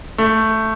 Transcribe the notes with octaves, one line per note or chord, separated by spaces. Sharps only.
A3